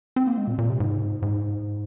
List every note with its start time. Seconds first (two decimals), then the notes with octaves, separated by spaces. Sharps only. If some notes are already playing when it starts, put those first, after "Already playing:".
0.16 C4
0.27 A#3
0.38 G#3
0.48 A#2
0.58 A#2
0.70 C3
0.80 G#2
1.22 G#2